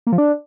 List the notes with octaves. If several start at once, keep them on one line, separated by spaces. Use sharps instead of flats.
A#3
F3
D4